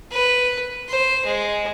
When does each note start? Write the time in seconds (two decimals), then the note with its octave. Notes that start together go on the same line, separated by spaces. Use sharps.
0.11 B4
0.88 C5
1.25 G#3